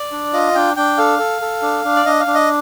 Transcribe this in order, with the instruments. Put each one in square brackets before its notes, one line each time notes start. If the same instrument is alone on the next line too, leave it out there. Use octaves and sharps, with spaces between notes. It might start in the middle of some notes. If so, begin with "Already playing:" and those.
Already playing: [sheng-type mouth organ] D5
D4
F4 D#5
D4 G5
D4 G5
A4 F5
A4
A4
D4
D4
D5
D4 D#5
F5
D4
D#5